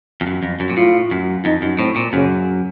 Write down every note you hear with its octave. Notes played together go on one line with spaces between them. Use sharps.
F2
F#2
F2
F#2
A#2
A2 F4
F#2
F2 D#4
F#2
A2 C4
A#2
F#2 C#3